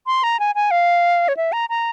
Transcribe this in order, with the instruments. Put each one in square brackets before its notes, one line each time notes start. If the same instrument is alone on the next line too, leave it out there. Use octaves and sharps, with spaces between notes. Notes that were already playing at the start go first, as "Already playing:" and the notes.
[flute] C6
A#5
G#5
G#5
F5
C#5
E5
A#5
A#5